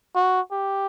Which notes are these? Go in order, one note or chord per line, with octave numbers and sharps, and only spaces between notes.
F#4
G4